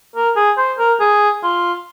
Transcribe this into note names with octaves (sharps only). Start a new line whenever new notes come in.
A#4
G#4
C5
A#4
G#4
F4